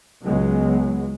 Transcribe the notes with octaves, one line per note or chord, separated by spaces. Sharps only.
C#2 F#3 G#3 B3